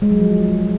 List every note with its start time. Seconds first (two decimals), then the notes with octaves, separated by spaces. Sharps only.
0.02 G#3
0.11 F#3
0.20 F3